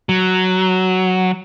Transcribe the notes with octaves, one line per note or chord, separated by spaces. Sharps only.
F#3